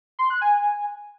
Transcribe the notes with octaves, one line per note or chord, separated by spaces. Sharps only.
C6
F#6
G#5